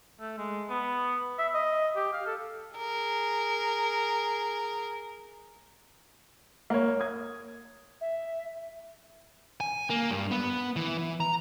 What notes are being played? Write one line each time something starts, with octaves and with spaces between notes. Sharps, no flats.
A3
G#3
B3
E5
D#5
G4
F5
A4
G#4 A#4
A#3 C#5
D#6 G#6
E5
G#5
A#3
G2
B3
E3
E3
A#5